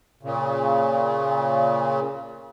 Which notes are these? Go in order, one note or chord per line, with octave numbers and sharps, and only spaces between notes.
A#2 C#3